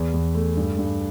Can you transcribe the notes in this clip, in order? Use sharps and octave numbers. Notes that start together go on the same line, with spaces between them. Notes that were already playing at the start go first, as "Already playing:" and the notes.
Already playing: E2
E2
A3
G2
G2